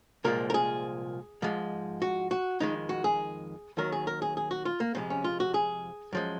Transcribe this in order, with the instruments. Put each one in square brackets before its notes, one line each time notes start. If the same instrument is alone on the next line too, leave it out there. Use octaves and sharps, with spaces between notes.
[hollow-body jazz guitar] C2 A#2 F3 G#3 A#4
A#4
G#4
G#2 F3 G#3
F#4
F#4
F2 D#3 G#3 D#4
F#4
G#4
D#2 D#3 F#3 A#4
G#4
A#4
G#4
G#4
F#4
F4
A#3
F2 C3 F3 G#3 C4
C#4
F4
F#4
G#4
F#2 F3 G#3